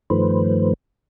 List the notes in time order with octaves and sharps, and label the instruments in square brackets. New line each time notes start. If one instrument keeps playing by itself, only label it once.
[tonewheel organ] G2 D#3 F3 A3 B4 C5